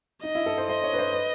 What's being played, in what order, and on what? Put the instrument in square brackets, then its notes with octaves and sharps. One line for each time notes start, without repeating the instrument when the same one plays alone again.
[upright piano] D#4 [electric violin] D#5
[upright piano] E4
A4
C5
[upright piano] C5 [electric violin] D#5
[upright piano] C#5
B4
C5
B4